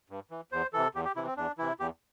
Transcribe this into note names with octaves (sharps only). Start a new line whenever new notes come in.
G2
E3
E2 C5
C3 E3 A4
E2 G4
G4
C3 E3 E4
C4
E2 D4
C3 E3 E4
E2 G4